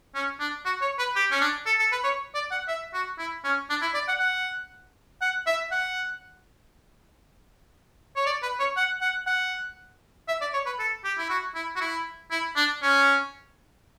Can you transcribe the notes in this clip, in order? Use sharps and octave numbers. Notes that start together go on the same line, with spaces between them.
C#4
D4
F#4
C#5
B4
G4
C#4
D4
A4
A4
B4
C#5
D5
F#5
E5
F#4
E4
C#4
D4
E4
D5
F#5
F#5
F#5
E5
F#5
C#5
D5
B4
C#5
F#5
F#5
F#5
E5
D5
C#5
B4
A4
G4
E4
F#4
E4
F#4
E4
E4
D4
C#4